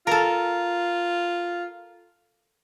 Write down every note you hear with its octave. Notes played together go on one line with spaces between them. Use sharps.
F4 A4 A#4